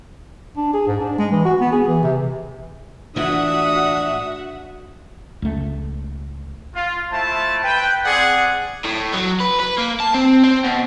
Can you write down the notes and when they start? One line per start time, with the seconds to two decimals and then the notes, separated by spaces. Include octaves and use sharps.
0.57 D4
0.73 G#4
0.87 G#2
1.01 D4
1.18 G#3
1.31 E3
1.45 F#4
1.60 B3
1.72 G#4
1.87 E3
2.03 C3
3.16 A2 E3 F3 D4 F#4 E5 F#5 D#6
5.42 C#2 A3
6.74 F4
7.11 A3 E4 F4 C5 A5
7.63 B4 G5
8.05 C4 G#4 D5 F#5
8.85 A2
9.13 F#3
9.40 B4
9.60 B4
9.78 A#3
10.00 A5
10.14 C4
10.44 C4
10.64 B2